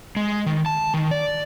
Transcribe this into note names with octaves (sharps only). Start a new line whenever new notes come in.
G#3
D#3
A5
D#3
D5